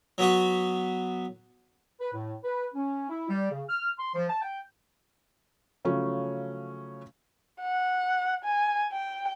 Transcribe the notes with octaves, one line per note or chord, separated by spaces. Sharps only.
F#3 B3 F#4
B4
A2
B4
C#4
E4
G3
C#3
F6
C6
F3
A5
G5
C#3 F3 F#3 A3 C#4
F#5
G#5
G5